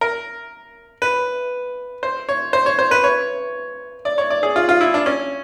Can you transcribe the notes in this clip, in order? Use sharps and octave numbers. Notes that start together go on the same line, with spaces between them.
A#4
B4
C5
C#5
C5
C#5
C5
B4
C#5
D5
C#5
D5
G#4
F4
F4
E4
D4
C#4